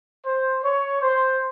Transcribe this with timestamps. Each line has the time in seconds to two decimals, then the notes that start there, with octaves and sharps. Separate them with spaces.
0.25 C5
0.63 C#5
1.02 C5